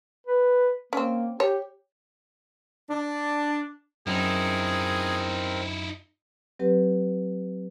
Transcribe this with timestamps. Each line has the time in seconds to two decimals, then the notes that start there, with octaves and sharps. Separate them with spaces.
0.27 B4
0.93 A#3 C4 C#4
1.40 G4 C#5
2.90 D4
4.07 F#2 C4 D#4 E4 G#4 A#4
6.59 F#3 C4 G4 B4